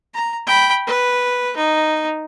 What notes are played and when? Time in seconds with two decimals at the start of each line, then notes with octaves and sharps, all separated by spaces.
0.14 A#5
0.47 G5 B5
0.87 B4
1.56 D#4